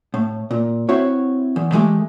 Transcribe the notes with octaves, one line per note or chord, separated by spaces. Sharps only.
A2
A#2
C4 E4 F#4 C#5
E2
E3 G#3 A3 G4